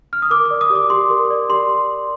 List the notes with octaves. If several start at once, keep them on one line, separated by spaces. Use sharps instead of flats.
F6
D#6
A#4 D6
D6
D5
D#6
G4
D6
G4 C6
A#4
D5
G4 C6